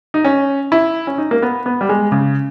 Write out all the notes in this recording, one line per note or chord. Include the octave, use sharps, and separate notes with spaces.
D#4
C#4
E4
C#4
D#4
A#3
B3
B3
G3
G#3
C#3